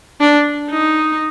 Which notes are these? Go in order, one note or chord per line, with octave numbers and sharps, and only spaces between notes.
D4
D#4